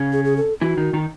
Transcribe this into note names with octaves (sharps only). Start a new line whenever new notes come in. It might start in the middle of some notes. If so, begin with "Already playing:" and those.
Already playing: C#3 C#4
G#4
G#4
A4
E3 E4 F#4
D#3 D#4
D#3 D#4